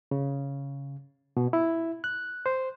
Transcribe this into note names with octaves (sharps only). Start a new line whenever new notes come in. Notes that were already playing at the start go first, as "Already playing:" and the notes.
C#3
B2
E4
F#6
C5